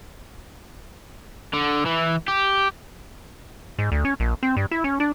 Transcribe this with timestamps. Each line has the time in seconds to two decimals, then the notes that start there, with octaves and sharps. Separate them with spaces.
1.54 D3
1.86 E3
2.28 G4
3.79 G#2
3.92 D2
4.05 C#4
4.20 A#1
4.43 C4
4.57 G2
4.71 E4
4.84 C#4
5.00 D4